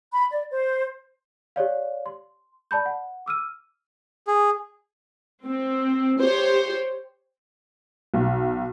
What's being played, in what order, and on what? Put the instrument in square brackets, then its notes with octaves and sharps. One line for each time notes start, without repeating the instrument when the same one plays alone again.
[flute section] B5
D5
C5
[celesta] G4 C#5 D5 F5
C6
D5 A5 B5 G6
F#5
D6 E6 F6 D#7
[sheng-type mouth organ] G#4
[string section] C4
G4 C5 C#5
[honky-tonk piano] B1